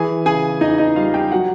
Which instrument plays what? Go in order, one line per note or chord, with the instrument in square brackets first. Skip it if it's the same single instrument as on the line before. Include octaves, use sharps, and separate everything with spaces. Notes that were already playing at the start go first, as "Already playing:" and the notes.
Already playing: [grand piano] E3 G#4 G#5
C#3 G#4 G#5
E2 D#4 D#5
D#4 D#5
G3 F4 F5
G4 G5
F#3 F#4 F#5